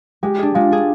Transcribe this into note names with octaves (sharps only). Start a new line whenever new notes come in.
G#3 G4
D4 G#4
G#3 F4
D4 G#4